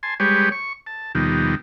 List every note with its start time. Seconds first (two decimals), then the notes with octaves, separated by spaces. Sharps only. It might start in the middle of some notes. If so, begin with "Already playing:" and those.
0.03 G#5 A5 C6
0.20 G3 G#3 G4 B4 C#5
0.52 C#6
0.87 A5
1.15 D#2 B2 D#3 F3 G3